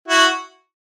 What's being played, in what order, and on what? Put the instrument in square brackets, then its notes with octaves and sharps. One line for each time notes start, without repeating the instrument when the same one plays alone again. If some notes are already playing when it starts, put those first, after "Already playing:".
[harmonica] E4 F#4